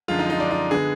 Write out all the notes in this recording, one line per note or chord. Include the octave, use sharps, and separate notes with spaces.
F#2 D3 F3 G#3 F4
D#4
D#4
D4
D#4
D3 G#3 B3 G#4